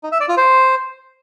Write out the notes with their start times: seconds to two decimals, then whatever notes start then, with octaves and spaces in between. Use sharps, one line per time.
0.03 D#4
0.12 E5
0.20 D5
0.29 F4
0.37 C5